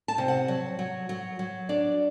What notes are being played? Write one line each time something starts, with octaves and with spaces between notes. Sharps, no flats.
A5
C3
F#5
F#3
F#3
F#3
F#3
D4 D5